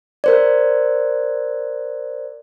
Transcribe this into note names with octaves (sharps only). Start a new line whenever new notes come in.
A#4 C5 D5